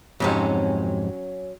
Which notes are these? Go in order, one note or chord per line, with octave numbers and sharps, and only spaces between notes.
F2 G#2 C3 F#3 C#4